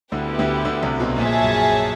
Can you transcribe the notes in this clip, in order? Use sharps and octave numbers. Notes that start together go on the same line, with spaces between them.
D2 D3 B3 E4 G4 B4
D2 D3
D2 D3
C2 C3
B1 B2
A#1 A#2 G#4 C#5 E5 A5
F#2